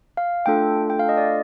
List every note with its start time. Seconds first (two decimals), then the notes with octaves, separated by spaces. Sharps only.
0.17 F5
0.46 A3 D4 F4 A4 G5
0.90 G5
0.99 F5
1.09 D#5
1.17 D5